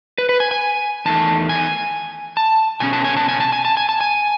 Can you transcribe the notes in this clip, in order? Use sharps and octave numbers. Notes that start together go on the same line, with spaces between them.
B4
B4
G#5
G#5
E2 D#3 A3 A5
G#5
A5
B2 G#3 C#4 G#5
A5
G#5
A5
G#5
A5
G#5
A5
G#5
A5
G#5